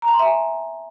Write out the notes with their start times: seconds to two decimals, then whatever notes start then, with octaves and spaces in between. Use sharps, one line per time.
0.02 A#5
0.08 A5
0.14 C6
0.19 E5
0.25 G#5